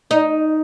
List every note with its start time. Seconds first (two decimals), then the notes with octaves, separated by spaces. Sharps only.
0.11 D#4